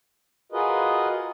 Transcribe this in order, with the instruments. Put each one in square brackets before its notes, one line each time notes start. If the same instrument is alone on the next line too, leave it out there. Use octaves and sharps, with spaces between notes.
[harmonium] F4 F#4 G#4 A#4 B4 D#5